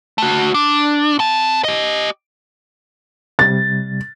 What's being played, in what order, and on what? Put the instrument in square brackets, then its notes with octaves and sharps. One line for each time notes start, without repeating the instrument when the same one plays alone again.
[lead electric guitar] A3 F#4
D4
C4 A5
G4 D#5
[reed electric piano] C3 G3 [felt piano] A6